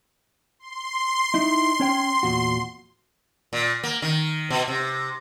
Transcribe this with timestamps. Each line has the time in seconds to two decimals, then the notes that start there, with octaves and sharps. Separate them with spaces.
0.59 C6
1.34 D#4 E4
1.80 C#4 C#5 G5
2.23 E2 A#2 F#4
3.53 A#2
3.84 A#3
4.02 D#3
4.50 B2
4.68 C3